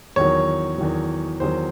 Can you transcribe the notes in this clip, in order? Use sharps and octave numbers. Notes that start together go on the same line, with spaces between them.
E2 D#3 F#3 C#5
E2 D#3 F#3
E2 D#3 F#3 C5